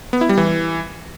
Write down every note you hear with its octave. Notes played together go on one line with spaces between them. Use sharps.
B3
E4
G3
E3